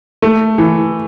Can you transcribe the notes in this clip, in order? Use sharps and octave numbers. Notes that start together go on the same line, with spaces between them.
A3
E3